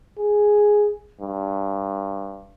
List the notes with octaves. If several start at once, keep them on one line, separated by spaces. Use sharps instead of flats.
G#4
G2